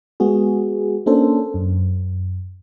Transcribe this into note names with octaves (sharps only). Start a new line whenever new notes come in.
G#3 B3 F#4 G#4
A#3 C#4 D4 A4 C5
F#2